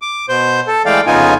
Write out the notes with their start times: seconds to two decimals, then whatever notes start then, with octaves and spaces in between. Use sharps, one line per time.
0.02 D6
0.29 B2 C5 G6
0.67 A4
0.86 E3 G#3 A3 D5 F5 G5
1.07 F2 C#3 B3 D#4 F4 G#5